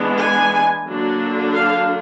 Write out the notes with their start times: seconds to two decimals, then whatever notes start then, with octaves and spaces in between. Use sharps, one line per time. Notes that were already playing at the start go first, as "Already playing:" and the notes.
Already playing: E3 G#3 B3 D4
0.20 G#5
0.87 D3 F#3 A#3 D4
1.53 F5